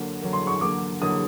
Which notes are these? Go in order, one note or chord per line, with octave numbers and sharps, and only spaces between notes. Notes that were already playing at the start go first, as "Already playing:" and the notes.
Already playing: D3 F#3 A#3
D3 F#3 A#3
C6
C#6
D3 F#3 A#3 D6
D3 F#3 A#3 D#6